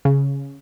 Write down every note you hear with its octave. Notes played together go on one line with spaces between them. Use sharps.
C#3